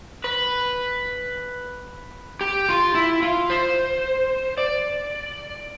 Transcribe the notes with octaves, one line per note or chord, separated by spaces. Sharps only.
B4
G4
F4
E4
F4
C5
D5